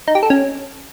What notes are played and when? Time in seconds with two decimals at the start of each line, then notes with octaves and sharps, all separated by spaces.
0.08 D#4
0.15 G4
0.23 A4
0.30 C#4